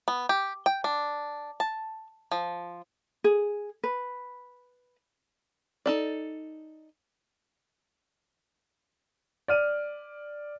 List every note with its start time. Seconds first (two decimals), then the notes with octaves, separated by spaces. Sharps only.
0.08 B3
0.29 G4
0.66 G5
0.84 D4
1.60 A5
2.31 F3
3.24 G#4
3.83 B4
5.86 D#4 A4 D5
9.48 D5 F6 D#7